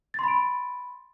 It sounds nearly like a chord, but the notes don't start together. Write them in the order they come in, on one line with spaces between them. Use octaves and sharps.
A6 C6 B5 D7